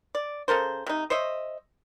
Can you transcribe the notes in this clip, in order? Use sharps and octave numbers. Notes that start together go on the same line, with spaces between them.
D5
C#3 A4 A#4 C5
C3 D#4
C5 C#5 D#5 E5